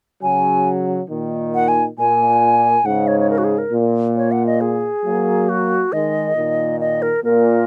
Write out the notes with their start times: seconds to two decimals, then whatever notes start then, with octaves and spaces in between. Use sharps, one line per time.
0.22 C#3 F#3 G#5
1.10 A#2 D#3
1.55 F#5
1.68 G#5
1.98 A#2 G#5
2.85 G#2 C#3 F#5
3.07 C#5
3.20 C#5
3.30 A#4
3.38 F#4
3.44 G#4
3.58 A#4
3.73 A#2
4.17 C#5
4.31 F#5
4.46 D#5
4.61 G#4
5.04 F#3 A#3
5.49 F#4
5.92 D#3 G#3 D#5
6.36 A#2 D#3
6.80 D#5
7.02 A#4
7.24 A#2 A#4